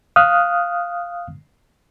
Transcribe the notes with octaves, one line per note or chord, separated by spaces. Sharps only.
F5 D#6 F6 F#6